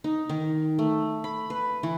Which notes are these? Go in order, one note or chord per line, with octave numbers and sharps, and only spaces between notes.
D#4
D#3
A3
B5
B4
E3